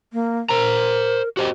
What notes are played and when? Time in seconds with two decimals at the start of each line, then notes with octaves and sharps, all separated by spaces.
0.13 A#3
0.49 A#4 C5 A#5
1.37 F#4 G4 C5 D#5